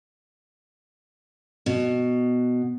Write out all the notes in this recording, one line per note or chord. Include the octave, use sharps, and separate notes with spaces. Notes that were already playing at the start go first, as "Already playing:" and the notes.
B2